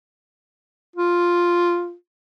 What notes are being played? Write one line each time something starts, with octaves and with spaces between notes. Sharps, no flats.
F4